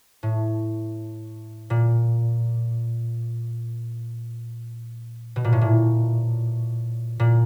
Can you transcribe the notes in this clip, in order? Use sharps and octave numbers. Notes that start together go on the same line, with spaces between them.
A2
A#2
B2
A#2
A2
A#2
A#2